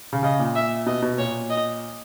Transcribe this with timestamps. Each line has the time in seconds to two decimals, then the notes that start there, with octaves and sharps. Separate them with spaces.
0.13 C#3
0.23 C#3 D#5
0.39 A#2
0.55 E5
0.86 B2 D#5
1.02 B2
1.18 A#2 C#5
1.50 D#5